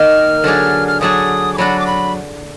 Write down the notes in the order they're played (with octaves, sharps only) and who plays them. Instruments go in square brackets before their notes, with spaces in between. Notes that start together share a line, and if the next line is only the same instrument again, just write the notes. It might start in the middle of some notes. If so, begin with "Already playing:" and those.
Already playing: [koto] D#3 A#3 D#4 A#4 [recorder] F6
[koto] D3 F#3 D4 G#4
[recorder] F6
[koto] D3 F#3 D4 G#4 [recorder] D#6
[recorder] D6
[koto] F#3 D4 F#4 [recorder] B5
[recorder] D6
B5